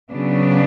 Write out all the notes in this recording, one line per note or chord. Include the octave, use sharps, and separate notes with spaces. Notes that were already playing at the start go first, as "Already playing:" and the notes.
C#3 F#3 B3 D4